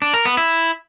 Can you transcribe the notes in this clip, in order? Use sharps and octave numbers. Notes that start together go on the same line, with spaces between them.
D4
A#4
B3
E4